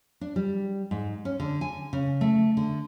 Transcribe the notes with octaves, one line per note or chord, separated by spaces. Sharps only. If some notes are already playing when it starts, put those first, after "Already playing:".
D4
G3
G#2
C#4
D3
G#5
C#3
A3
D3